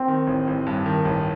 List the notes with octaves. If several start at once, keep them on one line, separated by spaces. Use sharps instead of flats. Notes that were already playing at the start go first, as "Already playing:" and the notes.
Already playing: C4
D#3
A1
A1
G2
D#3
A1